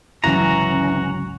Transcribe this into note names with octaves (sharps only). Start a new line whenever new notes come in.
G1 C#2 E3 F#3 C#4 F#4 A#5